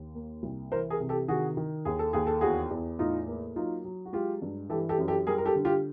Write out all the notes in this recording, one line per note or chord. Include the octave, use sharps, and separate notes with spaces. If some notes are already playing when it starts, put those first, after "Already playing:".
Already playing: D#2
A#3
C2
E3 A#4 C5
G#4 A#4
C3
G4 A4
D#3 F#4 G#4
D#3
D#2 G#4
A4
D#2 G#4
A4
E2 F#4 G#4
E2
A2 D#4 F4
A#3
F#3 D#4 F4
F#3
F#4
G#3 F4 G4
G2
E3 G4 A4
G4 A4
F#2
G4 A4
G3 G#4 A#4
A#4
G4 A4
D3
F4 G4